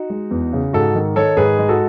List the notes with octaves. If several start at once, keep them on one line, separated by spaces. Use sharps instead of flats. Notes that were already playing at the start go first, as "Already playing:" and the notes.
Already playing: D#4 F#4
G#3
E2
C#3
G#2 F#4 A4
D#3
D#3 A4 C#5
G#2 G#4 B4
G#3
F#4 A4